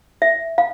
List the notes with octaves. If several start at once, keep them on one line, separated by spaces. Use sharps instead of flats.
E5
F5